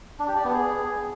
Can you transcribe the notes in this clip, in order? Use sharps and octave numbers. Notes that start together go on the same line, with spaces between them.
D4
G4
D5
B3
G#4